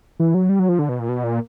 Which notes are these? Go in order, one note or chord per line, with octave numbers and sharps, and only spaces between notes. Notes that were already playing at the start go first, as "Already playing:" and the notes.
E3
F#3
G3
F#3
F3
D3
B2
A#2
B2
A#2